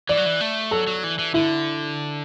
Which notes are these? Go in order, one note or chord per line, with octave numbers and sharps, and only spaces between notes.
E3 D5
F#3
E3
A3
F#3 A4
F#3
E3
E3
D3 E4